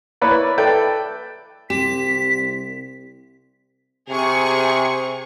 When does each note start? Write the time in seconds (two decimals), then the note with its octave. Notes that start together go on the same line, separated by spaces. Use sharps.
0.21 A#3 E4 B4 C#5 D5
0.58 A4 B4 D5 E5 G5 A5
1.70 C2 C4 G4 B6
4.09 C3 G#4 C#6